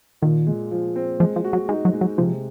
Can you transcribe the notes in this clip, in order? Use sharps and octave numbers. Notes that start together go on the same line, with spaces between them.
A#2 D#3
G#3
F3
C4
F3 G#3
F3
F#4
F#3
G#3 D#4
F#3
G#3
F#3
C3 F3